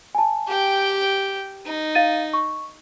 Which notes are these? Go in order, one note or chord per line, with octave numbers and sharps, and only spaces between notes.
G#5 A5
G4 G5
D#4
F5 A6 D#7
C#6